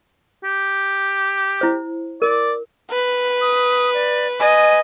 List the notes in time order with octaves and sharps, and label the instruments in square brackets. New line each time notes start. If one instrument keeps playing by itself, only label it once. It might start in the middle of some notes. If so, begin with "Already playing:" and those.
[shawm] G4
[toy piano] E4 C5
[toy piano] A#4 [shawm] D5
[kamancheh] B4
[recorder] D#6
D5
[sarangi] D#5 [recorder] G#5